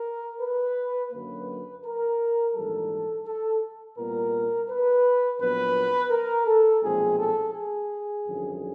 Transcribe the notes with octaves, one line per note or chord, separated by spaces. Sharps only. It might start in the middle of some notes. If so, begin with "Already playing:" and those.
Already playing: A#4
B4
F#2 D3 F#3 A#3 B4
A#4
A#1 G#2 E3 G3 A4
A4
C2 A#2 G3 B3 A#4
B4
A#1 A#2 F#3 B3 B4
A#4
A4
B1 A#2 F3 G#3 C4 G#4
A4
G#4
G#1 F#2 D3 F3